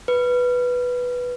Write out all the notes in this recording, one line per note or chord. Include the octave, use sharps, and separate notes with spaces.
B4